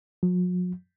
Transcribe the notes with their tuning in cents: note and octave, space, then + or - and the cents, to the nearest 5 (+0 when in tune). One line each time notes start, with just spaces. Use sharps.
F#3 -45